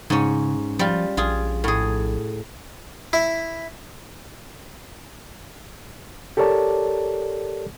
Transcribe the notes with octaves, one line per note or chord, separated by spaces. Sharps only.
G#2 C#3 C#4
F3 G3 F4
A#1 F4 G#4
A2 G#4
E4
G4 A4 A#4 C#5 D5 A5